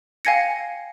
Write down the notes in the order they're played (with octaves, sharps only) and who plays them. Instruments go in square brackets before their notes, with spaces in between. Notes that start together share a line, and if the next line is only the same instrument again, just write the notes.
[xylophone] F5 G5 G#5 G#6 A#6 C#7